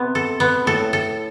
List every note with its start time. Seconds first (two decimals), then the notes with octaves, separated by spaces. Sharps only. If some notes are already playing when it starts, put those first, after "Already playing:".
Already playing: C3 B3
0.15 A4
0.40 B3
0.66 A2 A4
0.93 A4